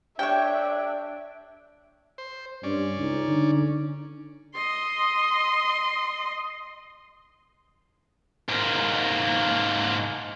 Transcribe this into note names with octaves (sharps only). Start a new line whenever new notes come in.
D4 G4 A4 C#5 E5 G5
C5
G2 C#4 D5
C#2 D#4
D3
D#5 C6
G#2 A#3